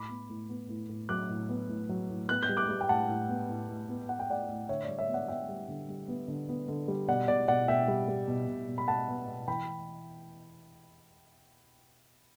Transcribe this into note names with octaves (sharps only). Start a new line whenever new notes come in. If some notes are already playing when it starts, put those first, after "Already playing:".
Already playing: A2 B5 D6
B3
A2
B3
A2
A2
F#3 D6 F#6
A2
B3
A2
F#3
A2
B3 F#6
G6
G3
D6 F#6
G3
G5
A2 F#5 A5
A2
B3
A2
A2
B3
B3 F#5
G5
A2 D5 F#5
A2
D3 C#5 E5
G3 D5
C#5 E5
B3
D5 F#5
B3 E5 G5
G3
D3
G3
B3
D3
B3
D3
G3
B2 D5 F#5
B2 D5
B2 D5 F#5
B2 E5 G5
G3
G3
B2
B2
B2
B5
B2 F#5 A5
B3
B2
E3 G5 B5